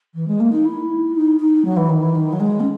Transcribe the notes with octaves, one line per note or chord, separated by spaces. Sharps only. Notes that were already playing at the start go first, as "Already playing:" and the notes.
E3
G#3
A#3
D#4
E4
D#4
D#4
F#3
E3
D#3
E3
D#3
F#3
G#3
C#4